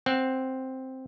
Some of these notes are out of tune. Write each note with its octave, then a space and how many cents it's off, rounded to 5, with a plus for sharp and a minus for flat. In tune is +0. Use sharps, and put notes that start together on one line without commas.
C4 +0 F#5 +0